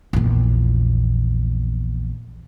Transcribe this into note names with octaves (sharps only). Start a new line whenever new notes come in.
A#1 E2